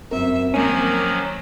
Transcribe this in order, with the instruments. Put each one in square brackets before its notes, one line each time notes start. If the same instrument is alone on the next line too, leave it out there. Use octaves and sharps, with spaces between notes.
[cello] F#2 E5 [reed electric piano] C4 A#4
[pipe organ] D#3 F3 F#3 [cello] A#3 [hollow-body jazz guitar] C#4